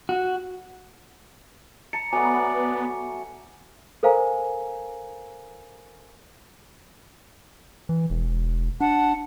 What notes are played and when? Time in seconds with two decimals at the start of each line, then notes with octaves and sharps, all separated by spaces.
0.09 F#4
1.93 A5 A#5 C#7
2.13 F#3 A3 B3 D5 G#5
4.03 A4 A#4 C5 F5 G#5 A#5
7.89 E3
8.10 E1
8.81 D4 F#5 A5